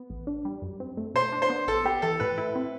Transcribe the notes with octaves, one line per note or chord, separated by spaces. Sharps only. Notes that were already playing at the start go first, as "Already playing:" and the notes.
Already playing: B3
A1
D4
G3
F#2
C4
A3
B2 C5
D4
C5
B3
A1 A4
B3 G4
E3 A4
A2 B4
E4
C4